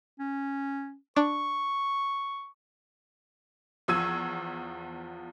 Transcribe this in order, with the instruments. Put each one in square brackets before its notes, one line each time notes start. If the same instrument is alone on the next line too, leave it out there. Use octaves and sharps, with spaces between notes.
[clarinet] C#4
[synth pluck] D4 [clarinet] C#6
[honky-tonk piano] E2 F3 E6 G#6 D#7